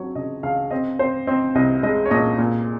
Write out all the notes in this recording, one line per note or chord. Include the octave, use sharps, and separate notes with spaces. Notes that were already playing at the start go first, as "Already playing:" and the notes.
Already playing: F#3 C4 C#5
C#3 D#5
C#2 F5
C4 D#5
C4 C5
C4 D#5
C2 D#5
G#3 D#5
C#5
A#2 D#5
A#2